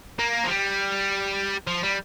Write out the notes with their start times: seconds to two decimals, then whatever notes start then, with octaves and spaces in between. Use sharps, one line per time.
0.19 A#3
0.44 F3
0.49 G3
1.67 F3
1.83 G3